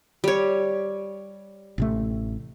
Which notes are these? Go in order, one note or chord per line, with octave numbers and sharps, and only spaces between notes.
G3 C#5
A1 C3 A3